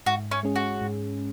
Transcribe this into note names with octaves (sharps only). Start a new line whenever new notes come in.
G#2 F#4
C#4
G#3 C#4 G#4
F#4
G#2